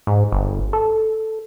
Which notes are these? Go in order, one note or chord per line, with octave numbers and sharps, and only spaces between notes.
G#2
G1
A4